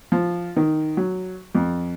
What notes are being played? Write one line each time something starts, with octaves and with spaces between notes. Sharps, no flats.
F3
D#3
F#3
F2